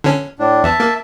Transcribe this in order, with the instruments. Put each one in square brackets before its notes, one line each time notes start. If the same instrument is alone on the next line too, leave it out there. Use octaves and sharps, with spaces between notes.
[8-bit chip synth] D3 C#4
[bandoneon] A2 D4
[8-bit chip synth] E2 [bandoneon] E5 A5
[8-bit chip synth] A#3